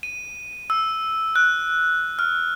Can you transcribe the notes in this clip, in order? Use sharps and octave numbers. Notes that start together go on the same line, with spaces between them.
D#7
E6
F#6
F6